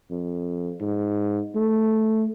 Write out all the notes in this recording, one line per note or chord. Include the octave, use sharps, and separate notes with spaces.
F2
G#2
A3